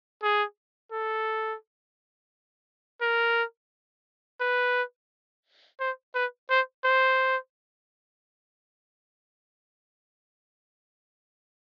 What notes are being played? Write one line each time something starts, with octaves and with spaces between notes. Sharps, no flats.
G#4
A4
A#4
B4
C5
B4
C5
C5